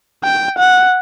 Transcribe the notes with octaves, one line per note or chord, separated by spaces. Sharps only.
G5
F#5